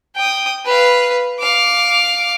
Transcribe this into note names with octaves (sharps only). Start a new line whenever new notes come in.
G5 D#6
B4 F5
F5 D6